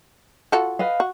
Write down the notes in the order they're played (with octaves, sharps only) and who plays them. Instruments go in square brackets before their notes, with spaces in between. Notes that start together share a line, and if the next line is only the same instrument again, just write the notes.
[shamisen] F4 F#4 A4
[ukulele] B4 D#5 F5
[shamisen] F#4